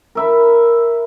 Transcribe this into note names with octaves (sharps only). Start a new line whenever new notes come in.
A#4 E5 B5